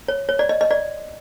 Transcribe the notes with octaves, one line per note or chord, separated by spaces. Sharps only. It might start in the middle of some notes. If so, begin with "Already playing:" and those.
C#5
C#5
D5
D#5
D#5
D5